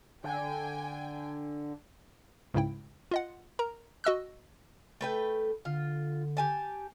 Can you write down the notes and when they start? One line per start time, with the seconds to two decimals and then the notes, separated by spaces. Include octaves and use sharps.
0.24 D3 G5 G#5
2.54 C#2 G#2 C#3 E4 G5
3.11 F4 D#5 F#5
3.59 A#4 A#5
4.04 F#4 D#5 E6 F#6
5.01 A3 B4 G5
5.65 D3 F4
6.37 G4 G#5 A5